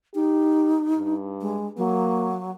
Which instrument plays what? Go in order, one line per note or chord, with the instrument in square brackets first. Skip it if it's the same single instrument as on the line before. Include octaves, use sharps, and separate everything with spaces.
[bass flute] D#4 [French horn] G4
[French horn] G2
[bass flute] G#3
[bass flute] F#3 [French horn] A#3